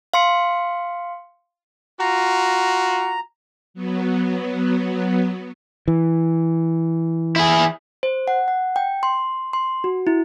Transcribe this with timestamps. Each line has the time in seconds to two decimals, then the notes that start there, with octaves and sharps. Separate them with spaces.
0.14 F5 C6 C#7
2.00 F4 F#4 A#5
3.74 F#3 B3
5.88 E3
7.36 E4 G#4
8.03 C5
8.28 F#5
8.48 F#5
8.76 G5
9.03 C6
9.53 C6
9.84 F#4
10.07 E4